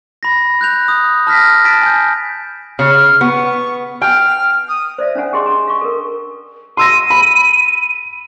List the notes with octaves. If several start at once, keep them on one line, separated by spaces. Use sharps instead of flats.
B5 A#6
F#6 G6 F7
D#6
A5 F6 A#6 B6
A5 A6 B6 D7
G#5 G6
C#3 F6
B3 C#6
G5 F6
D#6
C5 D5 E5 F5
C#4 D4 C5 F#5 G#5
C#4 G4 G#4 D#5 C6
D4 G#5 A#5
F5 C#6
A4 A#4
C6 E6 A#6 D#7
B5